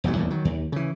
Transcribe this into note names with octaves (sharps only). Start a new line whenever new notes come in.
F1 B1 G#2 F#3
D#1 E2 A2
D#3 F#3
D#2
C#3 E3